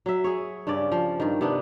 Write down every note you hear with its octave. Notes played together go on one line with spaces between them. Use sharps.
F#3 E5
G#4 C#5
G2 C#3 C#4 D5
F3
G2 D#3
C3 B3 D4